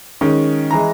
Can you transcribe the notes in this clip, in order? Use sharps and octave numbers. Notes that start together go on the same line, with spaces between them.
D#3 G#3 C#4
E3 G#3 A#5